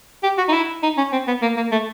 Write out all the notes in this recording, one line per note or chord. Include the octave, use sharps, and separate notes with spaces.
G4
F#4
D#4
E4
D#4
C#4
C4
B3
A#3
A#3
A3